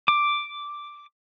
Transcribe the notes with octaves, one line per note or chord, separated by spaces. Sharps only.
D6